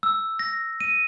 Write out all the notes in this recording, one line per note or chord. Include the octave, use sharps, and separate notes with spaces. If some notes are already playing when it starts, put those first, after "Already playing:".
E6
A#6
D#7